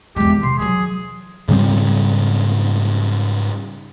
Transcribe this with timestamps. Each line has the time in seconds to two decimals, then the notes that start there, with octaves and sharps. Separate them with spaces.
0.16 E2 G#3 G4
0.30 D#3
0.43 C3 C6
0.59 E3 F#3 G#4
1.48 G#2 C#3 G3 C4